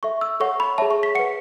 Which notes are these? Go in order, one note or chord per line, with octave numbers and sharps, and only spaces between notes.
A4 E5 C#6
E6
A4 C#5 F#5 C#6
B5
G#4 C#5 E5 A5
C#6
B6
B4 F#5 C#7